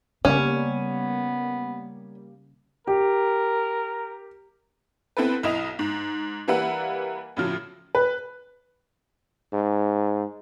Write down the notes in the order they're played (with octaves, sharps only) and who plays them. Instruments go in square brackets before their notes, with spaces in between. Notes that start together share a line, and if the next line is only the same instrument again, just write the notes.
[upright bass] C#3 [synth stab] G3 A#3 [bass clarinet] B3 [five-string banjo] C#4
[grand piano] G4 [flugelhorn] A#4
[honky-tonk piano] B3 C4 E4 A4 B4
B1 E4 D#5 F7
G#2
E3 G3 A#3 B4 E5 F#5
A2 C#3 F3 F#3
B4
[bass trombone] G#2